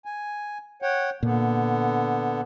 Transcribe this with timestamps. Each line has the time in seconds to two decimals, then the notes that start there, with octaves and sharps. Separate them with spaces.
0.05 G#5
0.82 C#5 F#5 G5
1.23 A#2 D3 B3